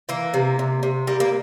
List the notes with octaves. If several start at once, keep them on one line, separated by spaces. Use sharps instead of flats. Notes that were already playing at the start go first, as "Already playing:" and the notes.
E3 A#3
C3
C3
C3
G3 A#3
A#3